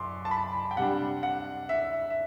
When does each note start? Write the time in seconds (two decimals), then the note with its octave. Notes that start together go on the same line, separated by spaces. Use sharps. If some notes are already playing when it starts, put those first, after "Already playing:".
Already playing: F#2 C6 D6
0.25 A5
0.31 B5
0.71 G5
0.77 C3 G3 D4 F#5
1.23 F#5
1.69 E5
2.10 E5